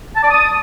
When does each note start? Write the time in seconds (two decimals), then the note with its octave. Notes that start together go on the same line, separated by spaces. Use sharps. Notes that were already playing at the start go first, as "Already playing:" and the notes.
0.16 A5
0.23 D5
0.30 D#6